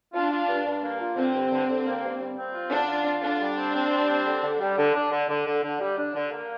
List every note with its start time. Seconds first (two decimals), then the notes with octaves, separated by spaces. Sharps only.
0.14 D4 F4
0.31 F4
0.48 G2
0.65 G2
0.82 A#3
0.99 F4
1.16 D3 C4
1.34 G2
1.51 D3
1.68 D3
1.85 A#3
2.02 G2
2.20 G3
2.37 C4
2.54 F4
2.71 D3 D4
2.88 F4
3.05 F4
3.22 D3 D4
3.40 G3
3.57 C4
3.74 C4
3.92 G3
4.09 C4
4.26 D3
4.42 D3
4.60 G3
4.78 D3
4.94 D4
5.11 D3
5.29 D3
5.46 D3
5.63 D3
5.80 G3
5.98 D4
6.15 D3
6.31 A#3